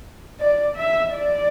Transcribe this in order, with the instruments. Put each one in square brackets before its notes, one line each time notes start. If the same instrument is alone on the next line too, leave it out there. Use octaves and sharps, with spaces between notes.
[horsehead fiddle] D5
E5
D5